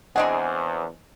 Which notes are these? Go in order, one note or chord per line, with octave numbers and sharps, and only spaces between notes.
E2 C4 D4 G#4 D#5 F#5